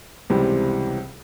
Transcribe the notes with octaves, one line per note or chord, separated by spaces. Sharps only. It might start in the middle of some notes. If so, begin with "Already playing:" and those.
C#2 C3 E3 G3 C4